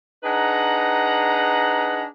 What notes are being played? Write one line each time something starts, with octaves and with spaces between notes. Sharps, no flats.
D4 D#4 G#4 B4 F#5 A#5